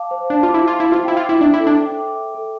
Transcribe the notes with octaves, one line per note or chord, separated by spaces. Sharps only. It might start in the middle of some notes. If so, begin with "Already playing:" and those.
Already playing: F5 A5 D6
C5
D4 A5
F4
D6
E4
F4 F5
E4
C5
F4
E4 G5
F4
D6
E4
D4 E5
E4
A4
D4
G5
D6
E5
A4